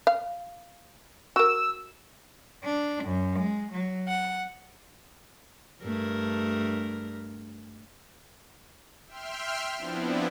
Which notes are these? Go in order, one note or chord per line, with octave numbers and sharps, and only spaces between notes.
F5
F#4 A#4 E6
D4
F#2
G#3
F#3
F#5
G2 A3 A#4
E5 G5 C6 F6
F3 B3 C4 D4 E4